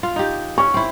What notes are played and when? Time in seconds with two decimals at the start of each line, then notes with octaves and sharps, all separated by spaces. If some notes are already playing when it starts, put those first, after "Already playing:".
0.03 F4
0.16 D#4 G4
0.58 C#4 C#6
0.74 C4 E4